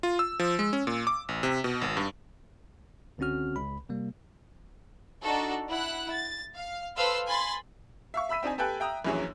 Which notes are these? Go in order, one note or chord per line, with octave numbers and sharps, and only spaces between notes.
F4
E6
F3
G#3
C#4
A#2
D6
A1
C3
B2
G#1
G2
C#2 D3 C4 C#4 F#4 F6
C#2 B5
C3 G3 A#3
D4 D#4 F#4 A4
E4 F#5 F#6
A6
F5
A4 B4 C5 F5 C6 E6
G#5 B5 C6 A6
E5 F5 C#6
E5 B5 E6 B6 D#7
C4 D4 D#4 G#5
G4 A4 B4 G5 G#5 F#6
E5 G5 A#5 D#6 E6
A#1 F#2 E3 F#3 G#4 C#5